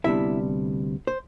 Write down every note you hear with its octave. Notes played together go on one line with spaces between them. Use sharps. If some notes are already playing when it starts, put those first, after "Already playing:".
D2 C3 G3 B3 D4 E4 E5
C5